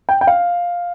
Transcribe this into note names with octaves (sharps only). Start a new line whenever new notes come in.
G5
G5
F5